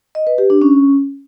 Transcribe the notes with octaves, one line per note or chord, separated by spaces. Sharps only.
D#5
B4
G4
D4
C#4